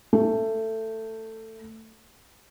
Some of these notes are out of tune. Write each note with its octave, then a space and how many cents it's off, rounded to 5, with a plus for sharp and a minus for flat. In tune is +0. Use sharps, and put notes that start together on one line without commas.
A3 +15